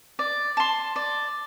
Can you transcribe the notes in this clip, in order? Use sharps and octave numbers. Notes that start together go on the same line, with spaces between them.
D5
A5 C6
D5